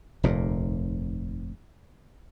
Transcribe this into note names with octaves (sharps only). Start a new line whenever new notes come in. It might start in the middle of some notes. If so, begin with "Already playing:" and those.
F1 D#2 A#2